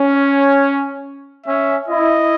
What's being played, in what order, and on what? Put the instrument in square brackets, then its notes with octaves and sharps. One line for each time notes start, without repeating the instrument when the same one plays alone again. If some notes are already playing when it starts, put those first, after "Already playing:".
Already playing: [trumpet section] C#4
[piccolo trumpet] C#5
[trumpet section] C#4 [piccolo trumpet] E5
[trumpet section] E4 [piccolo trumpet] D#5